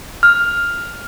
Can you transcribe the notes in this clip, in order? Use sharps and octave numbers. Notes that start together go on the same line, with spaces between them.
F6